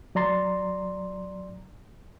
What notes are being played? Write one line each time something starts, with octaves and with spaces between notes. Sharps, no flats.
F#3 D5 A#5 C6 A6